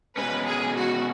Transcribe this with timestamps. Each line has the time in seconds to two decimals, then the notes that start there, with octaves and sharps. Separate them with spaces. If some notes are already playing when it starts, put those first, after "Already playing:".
0.17 B2 G#3 C#4 B4
0.46 G#4
0.76 F#4